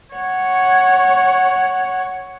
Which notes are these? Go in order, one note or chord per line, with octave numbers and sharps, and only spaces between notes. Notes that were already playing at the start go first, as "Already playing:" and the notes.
C#5 F#5